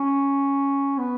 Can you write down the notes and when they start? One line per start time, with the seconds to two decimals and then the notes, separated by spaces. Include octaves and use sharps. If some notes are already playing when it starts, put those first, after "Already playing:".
Already playing: C#4
0.98 B3